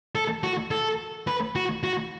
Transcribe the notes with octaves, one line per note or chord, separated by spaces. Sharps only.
A4
F#4
A4
B4
F#4
F#4